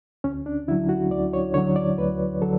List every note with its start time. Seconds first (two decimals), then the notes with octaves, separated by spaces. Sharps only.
0.24 D2 C#4
0.46 D4
0.68 D3 E4
0.71 F#3
0.89 F#4
1.11 D2 D5
1.33 C#5
1.54 D3 F#3 C#5
1.76 D5
1.98 D2 B4
2.41 D3 F#3 A4